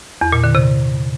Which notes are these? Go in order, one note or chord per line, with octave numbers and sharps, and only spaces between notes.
E2
A#2
D3
C3